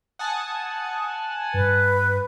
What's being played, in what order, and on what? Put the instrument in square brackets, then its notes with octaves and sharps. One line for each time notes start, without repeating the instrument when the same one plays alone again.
[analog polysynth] F#5 G#5 A5 [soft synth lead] D#6
[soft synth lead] G2 [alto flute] B4